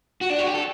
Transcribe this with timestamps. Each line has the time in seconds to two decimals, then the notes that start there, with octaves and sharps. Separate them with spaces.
0.21 F#4
0.30 D4
0.39 F#4
0.47 G4
0.54 A4